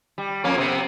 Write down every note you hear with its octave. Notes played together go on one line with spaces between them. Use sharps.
G3
F2 A#3 C#4
C3 B3 C4